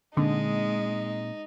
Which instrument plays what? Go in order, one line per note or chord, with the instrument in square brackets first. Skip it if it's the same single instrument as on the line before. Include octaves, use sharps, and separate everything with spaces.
[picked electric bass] A#2 A#3 C4 [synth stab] D3 [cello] G#3 [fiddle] D#4